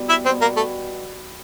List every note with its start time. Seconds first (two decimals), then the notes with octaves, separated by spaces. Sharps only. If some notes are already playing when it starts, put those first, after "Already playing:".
Already playing: B2 G3
0.09 E4 E5
0.25 B2 G3 B3 C4 C5
0.41 A#3 A#4
0.57 A3 A4